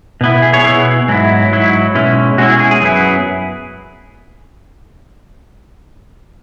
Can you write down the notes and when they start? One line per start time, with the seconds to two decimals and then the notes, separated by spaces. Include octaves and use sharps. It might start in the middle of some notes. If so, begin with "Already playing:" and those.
0.21 B2 B3 E4
0.42 G#4
0.53 G#4 C#5
0.64 B2 B3 E4 G#4
1.08 G#2 F#3 E4
1.52 G#2 F#3 E4
1.95 B2 G#3 C#4 E4
2.38 B2 G#3 C#4 E4 F#4
2.50 G#4
2.60 G#4
2.71 G#4
2.82 F#2 F#3 B3 E4